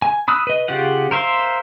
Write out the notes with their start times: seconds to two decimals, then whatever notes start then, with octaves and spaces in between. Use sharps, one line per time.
0.02 G#5
0.28 B5 D#6 E6 F#6
0.47 B4 D#5
0.68 C#3 F4 G4 F#5
1.11 A#4 C5 E5 F5 C6